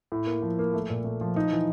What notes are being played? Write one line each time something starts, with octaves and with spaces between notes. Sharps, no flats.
A2
A#3
F3
A#3
A3
A#2
A3
F3
D#4
E3